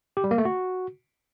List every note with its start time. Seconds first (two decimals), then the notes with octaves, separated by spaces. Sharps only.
0.17 G4
0.24 G3
0.31 A#3
0.38 A3
0.45 F#4